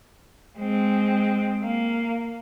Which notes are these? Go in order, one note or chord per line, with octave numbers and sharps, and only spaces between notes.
G#3 C4
A#3